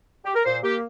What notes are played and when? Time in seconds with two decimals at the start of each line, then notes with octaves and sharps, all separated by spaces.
0.25 G4
0.35 A#4
0.45 A#2 C5
0.63 A#3 G4